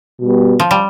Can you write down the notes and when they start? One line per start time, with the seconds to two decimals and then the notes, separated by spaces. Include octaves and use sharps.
0.20 B2 G3 B3
0.60 F3
0.71 G3